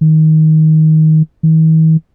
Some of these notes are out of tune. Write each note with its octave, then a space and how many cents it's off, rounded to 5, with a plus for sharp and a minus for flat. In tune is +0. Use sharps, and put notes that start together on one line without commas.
D#3 +15
D#3 +45